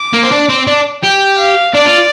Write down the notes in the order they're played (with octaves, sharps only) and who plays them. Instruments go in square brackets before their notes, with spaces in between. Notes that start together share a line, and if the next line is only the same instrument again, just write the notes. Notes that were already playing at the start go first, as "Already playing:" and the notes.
Already playing: [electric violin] D6
[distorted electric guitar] A#3
C4
D4
C4
D4
[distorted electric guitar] G4 [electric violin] G5
[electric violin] F5
[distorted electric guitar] D4 [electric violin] D5
[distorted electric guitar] F4